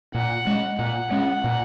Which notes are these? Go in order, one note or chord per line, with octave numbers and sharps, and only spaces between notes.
A#2 F#5
G#3 C#4
A#2 F#5
G#3 C#4
A#2